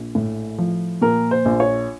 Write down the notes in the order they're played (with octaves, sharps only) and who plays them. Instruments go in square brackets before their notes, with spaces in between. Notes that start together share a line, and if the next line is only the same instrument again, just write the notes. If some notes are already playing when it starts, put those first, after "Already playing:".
Already playing: [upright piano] A#1
A2
F3
A#2 A#4
C5
A#1
C#5